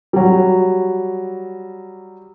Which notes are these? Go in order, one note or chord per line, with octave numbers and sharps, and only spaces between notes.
F#3 G3